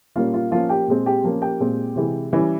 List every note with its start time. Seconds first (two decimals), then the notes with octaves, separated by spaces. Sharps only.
0.16 A#2 G3 A#3 C#4 F4 F5
0.34 F4 F5
0.51 F3 A#3 C#4 F4 F5
0.69 G4 G5
0.88 A#2 G#3 C4
1.06 G4 G5
1.24 F3 A#3 C#4
1.42 G4 G5
1.60 A#2 G#3 C4
1.96 C3 E3 G#3
2.33 E3 G3 C#4